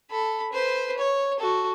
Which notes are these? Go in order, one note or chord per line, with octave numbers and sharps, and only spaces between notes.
A4 B5
B4 C5
C#5
F#4 A4